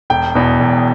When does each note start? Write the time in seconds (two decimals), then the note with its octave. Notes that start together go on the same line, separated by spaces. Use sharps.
0.10 E1 G5
0.35 E2 B2
0.59 E1